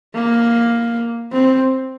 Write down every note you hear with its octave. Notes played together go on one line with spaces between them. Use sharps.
A#3
C4